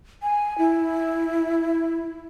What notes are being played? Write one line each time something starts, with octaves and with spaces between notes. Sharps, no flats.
G#5
E4